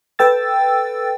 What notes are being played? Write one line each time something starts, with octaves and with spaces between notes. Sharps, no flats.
A4 B4 G5 E6 A6